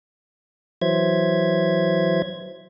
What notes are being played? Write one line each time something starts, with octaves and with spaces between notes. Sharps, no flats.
E3 F#3 C5 E5 G#6